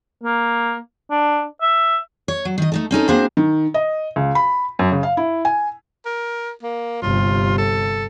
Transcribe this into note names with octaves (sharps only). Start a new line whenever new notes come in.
A#3
D4
E5
C#5
F#3
D#3 D#5
A3 D#4 A4
C4 C#4 D#4 A4
A#3 C4 D4 F#4 G#4 C5
D#3
D#5
C#2
B5
F#2
C#3
F5
E4
G#5
A#4
A#3
G1 C3 F4
A4